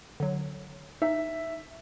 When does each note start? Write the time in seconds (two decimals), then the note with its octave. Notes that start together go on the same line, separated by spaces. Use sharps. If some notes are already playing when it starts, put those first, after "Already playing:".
0.20 D3 F#3
1.02 D#4 E5